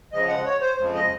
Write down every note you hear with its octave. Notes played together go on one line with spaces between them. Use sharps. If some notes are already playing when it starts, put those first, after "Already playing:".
F2 C#3 F3 G#3 D#5
F#5
C#5
C5
F2 C#3 F3 G#3
D#5